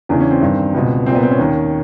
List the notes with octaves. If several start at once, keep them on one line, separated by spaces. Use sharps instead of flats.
E2 C#3 E3 D4
C#4
C4
G2 D#3
C#2 B2
C2 A#2 C4
B3
C4
C#4
D#2 D#3